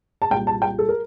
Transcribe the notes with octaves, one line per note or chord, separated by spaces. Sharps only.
A5
C2 A#2 G3 G5
A5
G5
A4
A#4